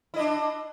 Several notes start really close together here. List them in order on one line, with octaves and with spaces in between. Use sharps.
E4 D#5 D4